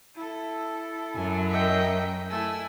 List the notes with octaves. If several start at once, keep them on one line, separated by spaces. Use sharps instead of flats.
E4 A4
F#2 F#3 G#5
A#4 D#5 E5 G5
A3 E4 G#5 E6